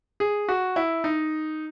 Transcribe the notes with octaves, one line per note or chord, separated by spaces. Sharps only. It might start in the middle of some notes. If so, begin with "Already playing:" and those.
G#4
F#4
E4
D#4